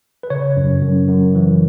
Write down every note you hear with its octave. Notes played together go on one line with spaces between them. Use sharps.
B4
C#3 C#5
F#2
F#2
F#2
E3